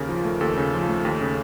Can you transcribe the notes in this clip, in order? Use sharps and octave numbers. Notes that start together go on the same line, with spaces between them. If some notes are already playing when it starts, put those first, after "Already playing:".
Already playing: D#2 C#3 A#4
F3
A3
D#2 A4
C#3
F3
A3
D#2
C#3